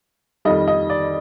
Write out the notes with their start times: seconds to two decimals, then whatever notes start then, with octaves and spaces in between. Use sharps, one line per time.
0.45 F2 D#3 G3 D#5
0.68 D#5
0.90 D5